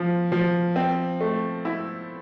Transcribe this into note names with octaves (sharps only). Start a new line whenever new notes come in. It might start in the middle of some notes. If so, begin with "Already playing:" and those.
Already playing: F3
F3
C4
A3
E4